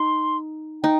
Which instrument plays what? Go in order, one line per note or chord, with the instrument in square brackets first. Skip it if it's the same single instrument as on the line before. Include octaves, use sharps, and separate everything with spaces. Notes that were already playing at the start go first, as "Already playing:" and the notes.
Already playing: [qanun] D#4 [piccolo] C6
[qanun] D#4 [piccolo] G5